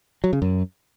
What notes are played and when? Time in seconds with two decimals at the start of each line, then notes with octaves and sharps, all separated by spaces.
0.24 F#3
0.33 C#3
0.42 F#2